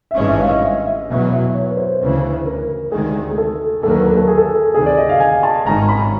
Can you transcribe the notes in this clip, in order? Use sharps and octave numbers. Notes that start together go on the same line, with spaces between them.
E5
G#1 G2 E3 G#3 C#4 D#5
E5
F5
D#5
E5
E5
E2 B2 F#3 E5
E5
C#5
B4
C5
D2 C#3 E3 B4
A#4
A#4
D2 C3 D#3 G#3 G#4
G#4
A4
D#2 D3 F#3 A4
A#4
B4
A#4
A4
G#4
A4
D2 C3 D#3 G#4
D5
D#5
F5
G#5
A5
G#1 G#2 D#3 G#3 C#4 A#5
B5